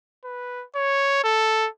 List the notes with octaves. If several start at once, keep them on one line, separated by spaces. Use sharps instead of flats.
B4
C#5
A4